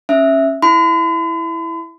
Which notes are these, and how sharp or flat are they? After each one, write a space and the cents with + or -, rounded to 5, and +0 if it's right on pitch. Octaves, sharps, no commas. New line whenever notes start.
C#4 -20 E5 +0
E4 +0 B5 +45